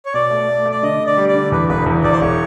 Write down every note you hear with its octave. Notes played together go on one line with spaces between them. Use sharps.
C#5
B2 D5
A3
A3
A3
D5
D3 D#5
D3
D5
G3
D5
D3
E2 B4
E1 B4
E2
E2 D5
C5
E1 C#5